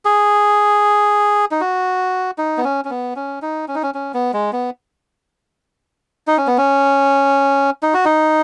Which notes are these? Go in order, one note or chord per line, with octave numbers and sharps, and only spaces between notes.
G#4
D#4
F#4
D#4
B3
C#4
C#4
B3
C#4
D#4
C#4
D#4
C#4
C#4
B3
G#3
B3
D#4
C#4
B3
C#4
D#4
F#4
D#4